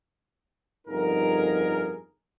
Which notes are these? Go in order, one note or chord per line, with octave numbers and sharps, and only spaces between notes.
G1 F2 D#4 G#4 A#4